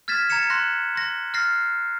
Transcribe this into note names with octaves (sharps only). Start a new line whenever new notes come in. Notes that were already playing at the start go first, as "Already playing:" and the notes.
F6 G#6 A6 B6 E7
A#5 G#6 A6 C#7 E7
C6 F#6 A#6
C6 A#6
F6 A6 A#6 C7